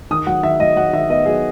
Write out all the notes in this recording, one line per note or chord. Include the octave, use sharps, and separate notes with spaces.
D#3 D#6
F#3 F#5
D#3 E5
F#3 D#5
F#3 F#5
D#3 E5
B3 D#5
F#3 G#4